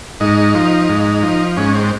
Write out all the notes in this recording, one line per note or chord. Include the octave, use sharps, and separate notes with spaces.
G#2 D#4
F3
G#2
F3
G#2 C#4
C4